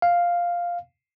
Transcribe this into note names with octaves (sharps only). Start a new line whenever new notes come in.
F5